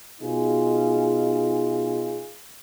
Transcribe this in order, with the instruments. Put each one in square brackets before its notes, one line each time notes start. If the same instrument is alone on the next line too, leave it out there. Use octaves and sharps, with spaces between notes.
[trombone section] B2 D#4 F4 G#4